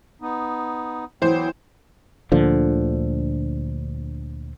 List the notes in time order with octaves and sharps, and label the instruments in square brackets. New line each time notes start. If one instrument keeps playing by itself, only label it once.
[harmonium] B3 D#4
[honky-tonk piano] E3 C5 [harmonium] F#3 B3 G5
[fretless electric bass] D2 A#2 D3 F3